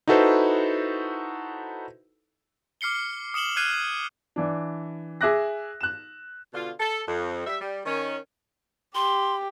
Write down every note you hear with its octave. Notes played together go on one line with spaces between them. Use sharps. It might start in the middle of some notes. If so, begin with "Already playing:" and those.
D#4 E4 F#4 A4 B4 C5
D6 F6 C7 C#7 G7
D#6 C#7 E7 F#7 G7
F6 F#6 G#6 C7 D#7
E3 D4
G#4 E5 D6 F#6 A#6
F#6 E7
B2 D3 F4
A4
F2
G3 E5
G3
D#3 C#4
G4 C6